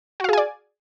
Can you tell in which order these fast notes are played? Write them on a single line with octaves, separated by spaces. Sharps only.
F#4 F5 G#4 G#5 D5